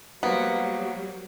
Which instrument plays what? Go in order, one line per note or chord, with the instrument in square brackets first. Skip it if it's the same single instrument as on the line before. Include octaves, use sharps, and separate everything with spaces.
[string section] F#3 G3 [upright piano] A#3 F#4 C5 [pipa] B3